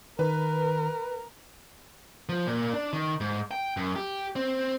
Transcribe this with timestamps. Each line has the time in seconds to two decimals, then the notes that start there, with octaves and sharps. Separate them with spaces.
0.19 D#3 A#4 B4
2.29 F3
2.47 A#2
2.73 D4
2.93 D#3
3.21 G#2
3.51 G5
3.77 F#2
3.96 G4
4.36 C4